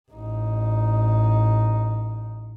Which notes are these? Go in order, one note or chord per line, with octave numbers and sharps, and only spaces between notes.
A1 D#4